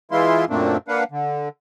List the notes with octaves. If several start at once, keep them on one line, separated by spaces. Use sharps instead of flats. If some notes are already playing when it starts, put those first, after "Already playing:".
E3 G#3 E4 F4 C6
F#2 A#2 A3 A#3 C4 D4
A#3 D4 B4 F5 F#5
D3